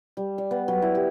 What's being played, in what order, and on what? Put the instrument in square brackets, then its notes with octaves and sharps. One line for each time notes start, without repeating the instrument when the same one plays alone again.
[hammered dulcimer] G3
D5
B3
F#3
E4
G4